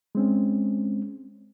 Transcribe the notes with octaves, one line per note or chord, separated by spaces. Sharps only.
G#3 C4 C#4